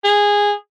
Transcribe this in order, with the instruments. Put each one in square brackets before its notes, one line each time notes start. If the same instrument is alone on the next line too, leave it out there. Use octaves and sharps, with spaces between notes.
[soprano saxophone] G#4